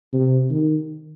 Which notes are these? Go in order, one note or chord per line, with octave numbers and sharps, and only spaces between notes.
C3
D#3